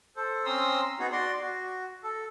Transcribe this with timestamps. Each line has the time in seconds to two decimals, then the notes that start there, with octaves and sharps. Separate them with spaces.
0.16 A4 C5
0.45 C4 C#4 A#5 C6 D#6 E6
0.99 B3 D#4 F#4 G#4
1.12 F#4 D5 C6
1.41 F#4
2.03 A4